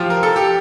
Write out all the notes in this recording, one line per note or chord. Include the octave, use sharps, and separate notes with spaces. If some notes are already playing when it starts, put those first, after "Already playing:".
Already playing: F3 F4 G4
A#4
A4
G4